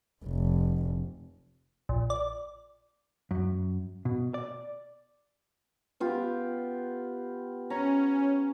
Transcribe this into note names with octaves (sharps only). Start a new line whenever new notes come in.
F1
A#1
D5
F#2
B2
D5
B3 F4 G4
C#4 A#5